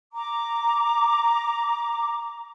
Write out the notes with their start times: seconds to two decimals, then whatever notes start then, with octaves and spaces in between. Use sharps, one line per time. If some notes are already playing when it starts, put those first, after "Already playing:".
0.13 A#5 D6